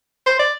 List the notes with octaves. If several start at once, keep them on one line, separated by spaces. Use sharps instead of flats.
C5
D5